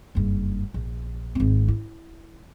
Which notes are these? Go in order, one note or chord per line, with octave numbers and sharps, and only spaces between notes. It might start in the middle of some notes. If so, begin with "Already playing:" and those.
F#1 G2
A#1
G#1 C4
E4